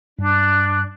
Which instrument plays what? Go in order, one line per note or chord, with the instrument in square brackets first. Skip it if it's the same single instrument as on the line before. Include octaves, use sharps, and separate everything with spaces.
[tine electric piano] G2 [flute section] D4 F#6